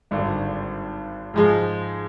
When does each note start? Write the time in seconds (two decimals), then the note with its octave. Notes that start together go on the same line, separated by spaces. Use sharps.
0.11 G#1 G2 D3
1.34 G#2 F3 G#3